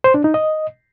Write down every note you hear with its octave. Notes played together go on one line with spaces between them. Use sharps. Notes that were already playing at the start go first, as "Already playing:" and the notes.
C5
D4
D#4
D#5